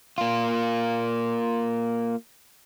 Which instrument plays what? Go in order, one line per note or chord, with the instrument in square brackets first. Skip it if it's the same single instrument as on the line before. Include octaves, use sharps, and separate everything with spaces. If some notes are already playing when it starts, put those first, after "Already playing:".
[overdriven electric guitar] A#3 F4